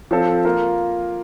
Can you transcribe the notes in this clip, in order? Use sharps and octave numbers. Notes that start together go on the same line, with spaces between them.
F3 C4 F4 A4
A#3 F4 A#4